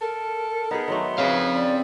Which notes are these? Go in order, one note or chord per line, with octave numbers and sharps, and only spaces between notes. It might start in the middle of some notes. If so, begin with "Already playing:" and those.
A4 A#4
B3 D#4 G#4
D#3 F#3 A3 C6
C#3 C4 G#4 B4 F5
D5